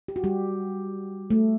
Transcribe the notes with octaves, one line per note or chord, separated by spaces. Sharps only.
G4
F#4
G3 G4
A3